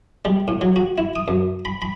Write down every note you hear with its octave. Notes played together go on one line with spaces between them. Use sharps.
G3
A2
F#3
F#4
E4
D#6
F#2
B5
B5